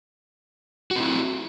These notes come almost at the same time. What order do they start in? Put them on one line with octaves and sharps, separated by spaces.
F#4 C4 E4